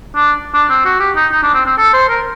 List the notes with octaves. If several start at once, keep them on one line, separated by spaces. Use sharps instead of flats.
D4
D4
C4
F#4
G4
D#4
D#4
D4
C4
C4
A4
C5
A#4